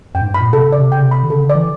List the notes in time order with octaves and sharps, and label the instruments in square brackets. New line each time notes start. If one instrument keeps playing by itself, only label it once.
[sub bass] F#2 [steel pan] G5
[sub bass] G#2
G2
[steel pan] B5
[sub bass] A#2
[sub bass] C3 [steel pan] A4
[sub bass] C#3
[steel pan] D5
[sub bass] C3
[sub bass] C#3 [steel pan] G5
[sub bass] C3
[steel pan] B5
[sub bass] D3
[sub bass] C#3 [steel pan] A4
[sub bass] D3
[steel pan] D5
[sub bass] E3